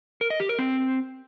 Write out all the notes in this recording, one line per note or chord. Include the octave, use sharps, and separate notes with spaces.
A#4
D#5
G4
A#4
C4